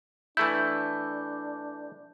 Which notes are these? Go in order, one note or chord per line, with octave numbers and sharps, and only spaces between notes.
E3 A3 D4 E4 G6